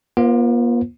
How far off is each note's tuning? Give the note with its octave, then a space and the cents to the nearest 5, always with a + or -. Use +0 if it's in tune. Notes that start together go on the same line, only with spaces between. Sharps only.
A#3 +45 F4 -5 C5 +0